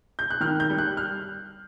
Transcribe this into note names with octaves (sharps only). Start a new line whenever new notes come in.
G6
F#6
D#3 F6
G6
G3
F#6
F6